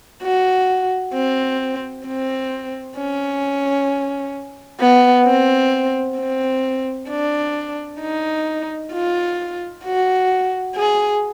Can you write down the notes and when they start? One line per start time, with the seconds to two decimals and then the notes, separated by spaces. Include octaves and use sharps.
0.23 F#4
1.14 C4
2.06 C4
2.98 C#4
4.80 B3
5.26 C4
6.18 C4
7.10 D4
8.01 D#4
8.93 F4
9.84 F#4
10.76 G#4